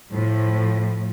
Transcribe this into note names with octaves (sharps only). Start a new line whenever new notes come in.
A2 F3